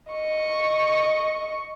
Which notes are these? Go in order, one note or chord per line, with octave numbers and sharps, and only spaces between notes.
D#5 C#6